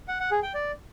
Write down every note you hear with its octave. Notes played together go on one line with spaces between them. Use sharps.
F#5
F#5
G#4
G5
D5